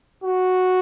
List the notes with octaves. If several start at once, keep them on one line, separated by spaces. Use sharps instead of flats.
F#4